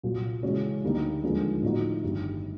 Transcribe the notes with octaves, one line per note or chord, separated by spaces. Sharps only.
C2 A#2 F#3
C#3 E3 G#3 C#4 F#4
D2 D3 G3 A#3 D#4
D#2 D3 F3 G#3
A2 F3 A#3 D#4 F#4
G1 G2 D#3 G3